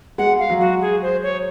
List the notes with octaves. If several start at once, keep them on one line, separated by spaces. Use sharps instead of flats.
G#3 F#5
F5
F#3
F#4
G#4
C5
C#5